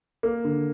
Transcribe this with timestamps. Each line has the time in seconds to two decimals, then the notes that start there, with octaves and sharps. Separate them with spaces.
0.23 A#3
0.45 D3